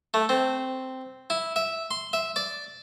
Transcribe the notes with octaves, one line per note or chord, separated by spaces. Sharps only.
A3
C4
E4
E5
C6
E5
D5